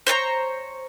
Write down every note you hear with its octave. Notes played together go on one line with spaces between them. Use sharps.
C5 C#5 A5 A#5